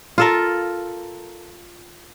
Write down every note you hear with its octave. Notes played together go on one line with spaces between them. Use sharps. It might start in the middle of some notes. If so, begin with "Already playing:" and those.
F4 A4 A#4